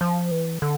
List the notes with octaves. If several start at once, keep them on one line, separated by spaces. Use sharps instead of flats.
F3
E3
D3